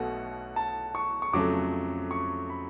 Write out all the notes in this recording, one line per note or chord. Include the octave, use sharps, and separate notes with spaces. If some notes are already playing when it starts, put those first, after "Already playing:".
Already playing: B1 B2 A3 F#5
A5
C#6
C#6
F2 C#3 F#3 A3 D6
C#6
B5